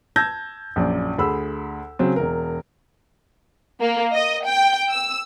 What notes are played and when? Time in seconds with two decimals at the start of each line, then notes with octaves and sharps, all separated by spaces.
0.16 A5 E6 G6 G#6 A#6
0.76 A#1 F#2 D5
1.18 D2 G#4 B5 E6
1.99 C#3 F#3 C4
2.16 E1 A#4
3.81 A#3
4.13 D#5
4.46 G5
4.90 E6